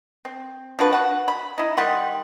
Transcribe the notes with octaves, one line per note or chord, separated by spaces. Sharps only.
C4
F3 D4 F#4 B4
F#4 F#5
B5
D#4 E4
D#3 G3 F#5 C6